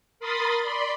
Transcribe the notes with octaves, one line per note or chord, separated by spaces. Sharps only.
A#4 B5 C6 D#6 A6
D5 B5 C6